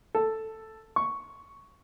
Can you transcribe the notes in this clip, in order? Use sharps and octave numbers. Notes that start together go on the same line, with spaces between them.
A4
C#6